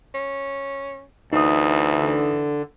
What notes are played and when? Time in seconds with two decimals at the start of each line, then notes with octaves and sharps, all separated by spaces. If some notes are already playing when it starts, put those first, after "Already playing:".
0.14 C#4
1.33 D2 E3 D#4 D#6
1.99 D3